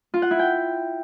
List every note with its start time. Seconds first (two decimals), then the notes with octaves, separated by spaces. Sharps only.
0.14 F4
0.22 F#5
0.31 E4
0.39 G5